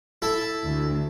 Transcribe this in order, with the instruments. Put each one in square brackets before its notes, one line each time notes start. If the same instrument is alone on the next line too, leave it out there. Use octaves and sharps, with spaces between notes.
[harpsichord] E4 A4
[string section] D2